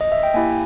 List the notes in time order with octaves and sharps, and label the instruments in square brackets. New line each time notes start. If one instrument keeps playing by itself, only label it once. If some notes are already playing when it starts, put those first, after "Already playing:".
[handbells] D#5
E5
G5
A#3 E4 G4 G#5